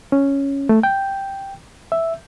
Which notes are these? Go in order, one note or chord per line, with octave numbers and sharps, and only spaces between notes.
C#4
A3
G5
E5